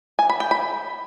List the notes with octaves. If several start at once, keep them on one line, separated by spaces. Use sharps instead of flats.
G#5
B5
G5
B5